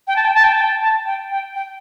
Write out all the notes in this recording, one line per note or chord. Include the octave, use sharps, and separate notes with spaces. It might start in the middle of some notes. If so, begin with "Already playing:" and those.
G5
A5
G5
A5
G5
A5
G5
A5
G5
G5
G5